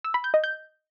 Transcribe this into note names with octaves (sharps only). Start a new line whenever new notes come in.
E6
B5
G6
D#5
G6